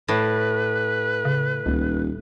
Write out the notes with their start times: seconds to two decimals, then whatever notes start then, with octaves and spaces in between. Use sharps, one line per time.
0.08 A2 B4
1.25 C#3
1.66 D#1 C#2